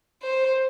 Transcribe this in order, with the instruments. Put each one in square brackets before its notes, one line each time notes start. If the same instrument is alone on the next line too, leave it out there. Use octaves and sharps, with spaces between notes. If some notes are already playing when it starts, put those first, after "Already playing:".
[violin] C5